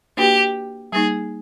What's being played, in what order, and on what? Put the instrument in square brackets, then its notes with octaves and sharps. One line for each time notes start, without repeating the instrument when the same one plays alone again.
[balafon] A#3 D4 F#4 B4 [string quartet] G4
[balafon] G3 A#3 D#4 [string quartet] G#4